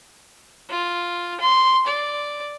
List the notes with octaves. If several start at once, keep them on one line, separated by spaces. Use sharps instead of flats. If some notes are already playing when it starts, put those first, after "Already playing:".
F4
C6
D5